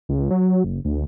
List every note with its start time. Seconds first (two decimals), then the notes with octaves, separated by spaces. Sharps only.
0.09 C#2
0.31 F#3
0.64 F#1
0.85 D2